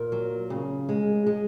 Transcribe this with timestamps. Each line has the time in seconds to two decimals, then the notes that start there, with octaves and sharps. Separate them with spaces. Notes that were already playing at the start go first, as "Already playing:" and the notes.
Already playing: A#2 A#4
0.12 F#3
0.50 C#3
0.89 G#3
1.27 G#3